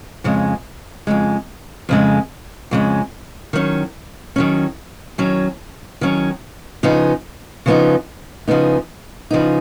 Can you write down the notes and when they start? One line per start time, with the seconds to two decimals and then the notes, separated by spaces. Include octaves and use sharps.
0.24 F2 C#3 G#3
1.07 F2 C#3 G#3
1.89 F2 C#3 G#3
2.71 F2 C#3 G#3
3.53 D#3 F#3 C#4
4.36 D#3 F#3 C#4
5.18 D#3 F#3 C#4
6.01 D#3 F#3 C#4
6.83 C#3 F3 B3 D#4
7.66 C#3 F3 B3 D#4
8.47 C#3 F3 B3 D#4
9.31 C#3 F3 B3 D#4